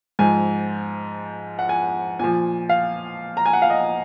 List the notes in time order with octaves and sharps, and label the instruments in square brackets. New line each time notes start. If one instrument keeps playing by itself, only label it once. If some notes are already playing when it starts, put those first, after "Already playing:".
[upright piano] G#2 F3 G#5
F#5
G#5
A#2 F3 G#5
F5
A#5
G#5
F#5
F5
D#5